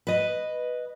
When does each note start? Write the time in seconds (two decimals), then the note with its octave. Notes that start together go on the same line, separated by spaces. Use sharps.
0.07 B4 D#5